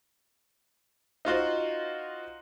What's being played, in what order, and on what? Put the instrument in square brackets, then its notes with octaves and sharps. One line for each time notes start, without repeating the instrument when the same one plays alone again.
[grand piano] D#4 F4 F#4 C5